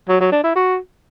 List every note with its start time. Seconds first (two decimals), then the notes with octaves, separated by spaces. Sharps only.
0.09 F#3
0.20 F#3
0.32 D4
0.44 E4
0.55 F#4